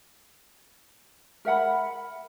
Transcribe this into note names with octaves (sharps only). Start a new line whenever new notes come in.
A#4 E5 F#5 B5